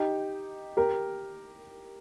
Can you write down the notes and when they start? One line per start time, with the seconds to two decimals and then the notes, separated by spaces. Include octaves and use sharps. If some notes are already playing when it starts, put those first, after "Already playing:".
Already playing: D#4 G4
0.77 G4 A#4